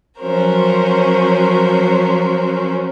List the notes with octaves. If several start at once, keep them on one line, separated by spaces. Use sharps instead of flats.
F3 F#3 C#4 F#4 A#4 C5